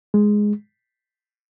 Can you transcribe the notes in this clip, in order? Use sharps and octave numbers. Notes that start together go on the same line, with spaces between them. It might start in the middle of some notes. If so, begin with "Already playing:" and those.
G#3